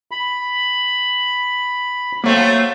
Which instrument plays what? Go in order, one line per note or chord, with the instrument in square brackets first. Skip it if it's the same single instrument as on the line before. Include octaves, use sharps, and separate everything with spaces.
[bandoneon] B5
[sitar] F#3 A3 C4 [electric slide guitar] A#3 C#5 F5